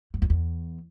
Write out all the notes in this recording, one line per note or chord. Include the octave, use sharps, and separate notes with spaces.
G2
F2
E2